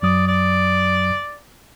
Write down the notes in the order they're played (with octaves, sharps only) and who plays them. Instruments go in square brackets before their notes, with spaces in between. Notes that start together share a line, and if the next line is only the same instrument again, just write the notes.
[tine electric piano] F#2 F#3 D#6 [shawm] D5
[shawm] D5